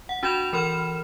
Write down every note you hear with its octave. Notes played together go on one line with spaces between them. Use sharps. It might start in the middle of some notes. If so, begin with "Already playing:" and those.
F#5
D4 F#4 B5 G6 E7 F7
E3 A#4 B5 F6 E7